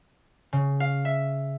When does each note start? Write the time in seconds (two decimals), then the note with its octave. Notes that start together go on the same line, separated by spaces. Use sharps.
0.53 C#3
0.80 F5
1.05 E5